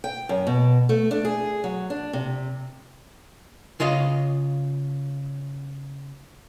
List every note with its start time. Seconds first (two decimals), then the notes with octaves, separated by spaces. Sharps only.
0.04 G5
0.29 F#2
0.47 B2
0.89 A3
1.11 D4
1.25 G#4
1.64 F#3
1.90 D4
2.13 C3
3.80 C#3 F4 D#5 F5